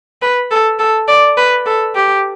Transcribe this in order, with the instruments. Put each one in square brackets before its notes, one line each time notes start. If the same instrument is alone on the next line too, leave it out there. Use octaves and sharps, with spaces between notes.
[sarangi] B4
A4
A4
D5
B4
A4
G4